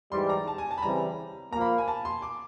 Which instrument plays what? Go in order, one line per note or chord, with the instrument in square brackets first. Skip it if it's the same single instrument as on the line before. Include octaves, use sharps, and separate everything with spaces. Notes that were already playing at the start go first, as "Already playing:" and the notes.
[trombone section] G#2 E3 G3 [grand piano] C6
[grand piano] A#5
A5
G#5
A5
B5
[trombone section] C#3 E3 G3 C4 [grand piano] A#5
[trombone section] A#2 F3 A#3 [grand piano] A#5
[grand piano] B5
G#5
A5
C6
D6